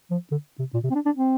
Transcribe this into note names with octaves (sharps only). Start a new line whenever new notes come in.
F3
D3
C3
A#2
C3
C4
D4
D4
C4